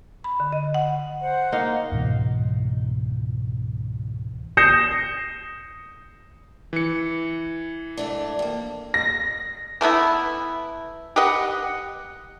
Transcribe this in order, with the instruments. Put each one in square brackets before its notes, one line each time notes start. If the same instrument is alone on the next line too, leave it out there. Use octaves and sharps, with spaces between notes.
[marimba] B5
D3
D#5
F#5
[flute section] C5 F#5
[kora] A#3 D#4 F5
[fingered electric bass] C#2 G#2 B2 E3
[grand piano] D#6 G6 A#6 C7 C#7 E7
[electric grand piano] E3 C#7
[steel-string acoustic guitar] G#2 A3 D4
F2 A#3
[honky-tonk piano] A#6
[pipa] E3 A3 B3 E4
G4 B4 D#5 F#5